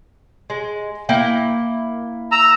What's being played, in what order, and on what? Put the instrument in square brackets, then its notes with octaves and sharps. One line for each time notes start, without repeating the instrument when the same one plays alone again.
[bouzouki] G#3
A#3 E4 G5
[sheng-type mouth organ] A#5 E6